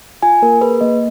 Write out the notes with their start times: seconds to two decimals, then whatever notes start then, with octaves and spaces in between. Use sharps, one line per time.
0.23 F4 G#5
0.42 A#3 A#4
0.61 G#4 B4
0.81 A#3 D#5